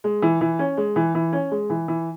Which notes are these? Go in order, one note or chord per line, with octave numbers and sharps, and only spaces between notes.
G#3
E3
E3
C#4
G#3
E3
E3
C#4
G#3
E3
E3